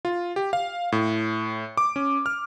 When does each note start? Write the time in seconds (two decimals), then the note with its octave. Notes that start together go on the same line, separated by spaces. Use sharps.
0.05 F4
0.36 G4
0.53 F5
0.92 A2
1.77 D6
1.96 C#4
2.26 F6